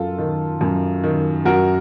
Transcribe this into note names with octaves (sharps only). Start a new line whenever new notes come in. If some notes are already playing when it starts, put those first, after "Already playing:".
Already playing: F#2 F4 A4
D#3
F#2
D#3
F#2 F#4 A#4